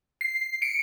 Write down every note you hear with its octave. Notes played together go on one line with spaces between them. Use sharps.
C7
C#7 D7